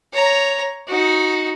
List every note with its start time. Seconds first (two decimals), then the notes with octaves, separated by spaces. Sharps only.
0.13 C#5 A#5
0.88 D#4 F#4